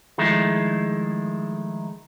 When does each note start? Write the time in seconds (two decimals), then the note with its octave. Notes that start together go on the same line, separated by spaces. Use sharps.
0.18 D#3 F3 G#3 A3 E4